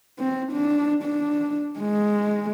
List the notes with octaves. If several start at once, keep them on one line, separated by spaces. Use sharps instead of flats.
C4
D4
D4
G#3